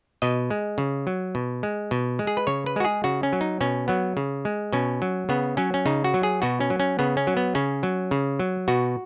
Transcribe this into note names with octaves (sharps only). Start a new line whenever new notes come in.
B2 D#5
G#3
C#3
F#3
B2
G#3
B2
G#3
G#4
B4
C#3 C#5
B4
G#3 F#4
G#4
C#3 F#4
C#4
F#3
D#4
B2 C#4
F#3 B3
C#3
G#3
B2 C#4
F#3
C#3 B3
F#3 C#4
C#4
C#3 D#4
F#4
F#3
G#4
B2 F#4
C#4
F#3
C#4
C#3 B3
C#4
F#3
B3
C#3 C#4
F#3
C#3
F#3
B2 F#4